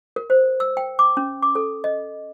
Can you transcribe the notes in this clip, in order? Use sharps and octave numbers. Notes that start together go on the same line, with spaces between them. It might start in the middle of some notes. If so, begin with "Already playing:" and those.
A#4
C5
E6
G5
D6
C#4
D6
A4
D#5